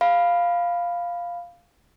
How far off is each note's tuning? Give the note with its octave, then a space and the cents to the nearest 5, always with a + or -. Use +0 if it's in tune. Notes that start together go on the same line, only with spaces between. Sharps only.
F5 +0 B5 +0